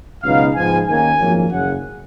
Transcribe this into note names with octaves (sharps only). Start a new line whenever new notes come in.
C#2 B2 F#3 B3 D#4 F5
G#2 F3 G#3 B3 G#5
D#2 D#3 A#3 C#4 G#5
G#1 F#2 F3 A#3 C#4
F#1 F#2 C#3 F#5